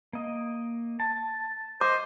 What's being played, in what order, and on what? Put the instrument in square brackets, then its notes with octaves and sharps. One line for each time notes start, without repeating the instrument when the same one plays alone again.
[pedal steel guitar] A#3 D#5
A5
[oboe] C5 [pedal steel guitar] D#5 [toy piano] D6